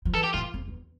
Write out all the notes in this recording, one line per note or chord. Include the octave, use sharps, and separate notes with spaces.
F3
E3 A4
G4
A2 F4
F2
E2